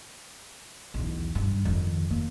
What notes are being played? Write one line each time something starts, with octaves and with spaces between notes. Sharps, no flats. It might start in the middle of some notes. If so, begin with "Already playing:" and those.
B1 E2
G2
F2 D#3
A#3